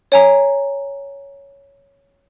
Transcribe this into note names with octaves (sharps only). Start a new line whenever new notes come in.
C#5 G#5 A#5